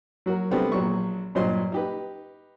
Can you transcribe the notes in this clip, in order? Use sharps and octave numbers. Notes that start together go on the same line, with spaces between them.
F#3 F#4 A#4
C3 G3 A3 B3 C4 D4
A#1 F#3 C#6
G2 A#2 F#3 C5 D#5 C6
D#4 G4 B4